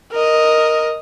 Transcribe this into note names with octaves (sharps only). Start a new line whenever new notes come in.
A#4 D#5